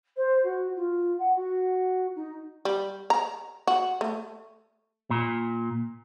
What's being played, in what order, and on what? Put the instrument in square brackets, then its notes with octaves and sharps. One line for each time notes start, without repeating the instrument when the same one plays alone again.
[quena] C5
F#4
F4
F#5
F#4
D#4
[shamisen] G3
A#5
F#4
A3
[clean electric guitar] A#2